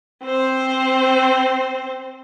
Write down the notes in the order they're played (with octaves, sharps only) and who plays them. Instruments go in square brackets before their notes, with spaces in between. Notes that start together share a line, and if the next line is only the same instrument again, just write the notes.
[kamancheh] C4 C5